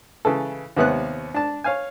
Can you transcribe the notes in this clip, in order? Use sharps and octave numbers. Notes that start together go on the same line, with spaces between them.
C#3 E3 A4
D#2 C3 B3 C#5 F#6
D4 A5
C#5 F5 G#5